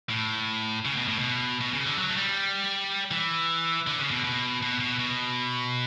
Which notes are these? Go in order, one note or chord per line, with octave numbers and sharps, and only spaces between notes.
A2
C#3
B2
A2
B2
B2
C#3
D3
F#3
A3
G3
E3
D3
C#3
B2
B2
B2
B2
B2